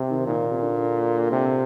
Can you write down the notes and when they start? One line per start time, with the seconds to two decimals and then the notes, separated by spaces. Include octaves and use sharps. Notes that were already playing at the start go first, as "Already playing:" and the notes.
Already playing: C3
0.09 D#3
0.26 A#2 D#3
0.51 C3
0.61 D3
1.31 C3